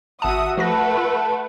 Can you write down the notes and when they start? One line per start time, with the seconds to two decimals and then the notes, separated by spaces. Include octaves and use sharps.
0.22 G#1 F#4 E5 F#5 A5 D#6
0.57 F3 A3 F#4 B4 F#5 A#6
0.97 F4